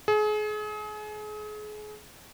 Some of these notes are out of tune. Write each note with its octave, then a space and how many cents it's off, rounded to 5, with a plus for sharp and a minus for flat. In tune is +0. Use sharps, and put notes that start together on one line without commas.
G#4 +35